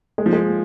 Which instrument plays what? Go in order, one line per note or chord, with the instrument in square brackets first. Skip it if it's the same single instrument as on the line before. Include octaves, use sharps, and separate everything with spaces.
[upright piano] G#3
F3
G#3